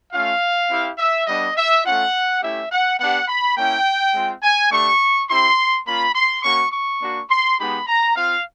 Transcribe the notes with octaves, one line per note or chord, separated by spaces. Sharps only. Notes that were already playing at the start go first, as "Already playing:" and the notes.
A3 C#4 F4 F5
C4 E4 G4
E5
G3 B3 D4 D#5
E5
A3 C#4 F4 F#5
A3 C#4 E4 G4 E5
F#5
B3 D4 G4 F#5
B5
A#3 C#4 E4 G5
G#3 C4 F4
G#5
A3 D4 G4 C#6
C4 E4 G4 C6
A#3 C#4 F4 B5
C6
A#3 C#4 F#4 C#6
C#6
A#3 D4 F#4
C6
G#3 B3 D#4 G4 B5
A#5
C4 F4 F5